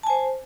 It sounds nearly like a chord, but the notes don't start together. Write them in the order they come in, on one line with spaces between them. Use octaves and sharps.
A5 G#5 C5